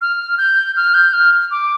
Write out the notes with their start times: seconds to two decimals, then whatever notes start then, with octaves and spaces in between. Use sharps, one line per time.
0.01 F6
0.38 G6
0.76 F6
0.94 G6
1.13 F6
1.51 D6